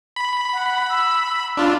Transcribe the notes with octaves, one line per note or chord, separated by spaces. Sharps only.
B5
F#5
E6
D4 F4 A5